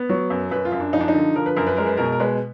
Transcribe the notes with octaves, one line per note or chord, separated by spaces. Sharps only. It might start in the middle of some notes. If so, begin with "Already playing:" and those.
Already playing: B3
F#3
F#2
F#2 B4
F4
F#2
D4
F3 D#4
D4
D#4
D3
F3 A#4
B4
F#2 A#4
B4
G#3 A#4
B4
B2 A#4
A#4
G#3 B4